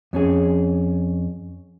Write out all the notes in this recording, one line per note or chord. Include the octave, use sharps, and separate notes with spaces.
F2 C#4 G#4